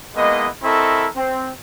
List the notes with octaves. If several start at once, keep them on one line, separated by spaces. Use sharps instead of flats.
G#3 A#3 B3 E4 D#5
C4 E4 A4 A#4 D#5 C#6
C4